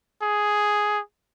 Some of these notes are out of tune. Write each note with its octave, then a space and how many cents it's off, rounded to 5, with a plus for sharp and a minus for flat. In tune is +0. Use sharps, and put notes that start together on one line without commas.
G#4 +5